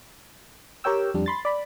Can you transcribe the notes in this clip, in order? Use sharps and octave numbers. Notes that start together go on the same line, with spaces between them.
G4 A#4 C#5 G5 E6
F2 G3 D4
B5 C6 A6
D5 B5